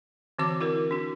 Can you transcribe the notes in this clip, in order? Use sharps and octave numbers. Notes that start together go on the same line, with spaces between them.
D3 E3 C4 F#4 D6
E4 F#4 A#4
D4 F#4